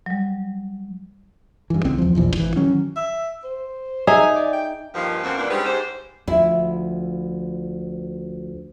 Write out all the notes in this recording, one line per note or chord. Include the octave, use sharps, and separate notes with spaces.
F#3 G3
G2 E3
C#2 C4
E2 F3
E1 A#1 E3 F3
G#1 E3
D#3 F#3 C#4
E5
C5
D#4 G#4 E5 G#5
D5
G5
G2 A#2 D#3 F3
F#2 B2 A#3 C4
F2 A#2 A#3 B3 D4
G3 G#3 C4 C#4 D#4 B4
G#2 G4 C5
D2 F3 E4